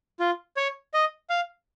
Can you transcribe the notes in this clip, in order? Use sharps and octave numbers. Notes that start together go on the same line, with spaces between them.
F4
C#5
D#5
F5